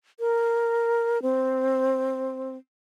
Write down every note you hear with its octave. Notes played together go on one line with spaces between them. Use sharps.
A#4
C4